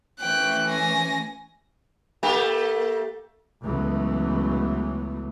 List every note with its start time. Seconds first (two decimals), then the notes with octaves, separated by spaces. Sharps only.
0.21 E3 A3 C#4 G5 F#6
0.67 G#5 A#6
2.23 A3 A#3 G4
3.63 C#2 E3 F#3 A3 B3